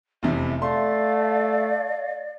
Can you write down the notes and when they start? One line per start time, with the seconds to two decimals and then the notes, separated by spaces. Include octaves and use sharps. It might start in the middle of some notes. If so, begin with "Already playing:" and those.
0.23 F1 E2 C3 E5
0.62 A3 D5 F5 C6